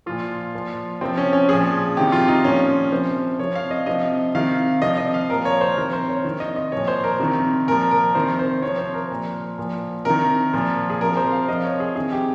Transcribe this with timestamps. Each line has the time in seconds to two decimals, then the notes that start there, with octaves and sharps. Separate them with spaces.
0.06 A#2 F3 F4
0.54 A#2 F3
1.01 C3 F3 C4
1.17 C#4
1.33 C#4
1.49 A#2 F3 G#4
1.97 C3 D#3 G4
2.12 F4
2.28 D#4
2.44 A#2 F3 C#4
2.92 C3 F3 C5
3.39 C3 F3 C#5
3.55 F5
3.71 D#5
3.86 C3 F3 D#5
4.35 C3 D#3 F5
4.82 C3 F3 D#5
4.98 D#5
5.14 F5
5.29 A#2 F3 A#4
5.45 C#5
5.61 C5
5.77 C3 D#3 A#4
5.93 C5
6.09 C#5
6.24 C3 D#3
6.40 D#5
6.56 D#5
6.72 A#2 F3 C#5
6.88 C5
7.04 A#4
7.20 C3 D#3
7.68 A#2 F3 A#4
7.91 A#4
8.15 C3 D#3 C5
8.39 C5
8.62 C3 F3 C#5
8.79 C5
8.94 A#4
9.10 A#2 F3
9.58 A#2 F3
10.05 C3 D#3 A#4
10.53 A#2 F3
10.90 G#4
11.01 C3 F3 A#4
11.17 C5
11.32 F5
11.48 C3 F3 D#5
11.64 C#5
11.80 G#4
11.95 C3 D#3 G#4
12.12 G4